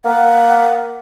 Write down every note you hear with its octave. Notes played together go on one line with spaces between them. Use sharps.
A#3 F#5